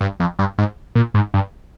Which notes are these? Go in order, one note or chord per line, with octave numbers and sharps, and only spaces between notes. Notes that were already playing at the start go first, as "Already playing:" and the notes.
G2
F2
G2
G#2
A#2
G#2
G2